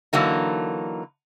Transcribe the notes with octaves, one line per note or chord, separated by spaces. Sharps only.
D3 E3 F#3 A#3 D#4